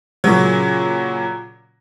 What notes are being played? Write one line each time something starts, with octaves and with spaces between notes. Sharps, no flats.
A#2 C#3 F#3